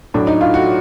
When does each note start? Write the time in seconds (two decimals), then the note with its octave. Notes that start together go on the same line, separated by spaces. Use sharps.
0.14 A2 F#3 A3 D4
0.27 D#4
0.41 F4
0.54 F#4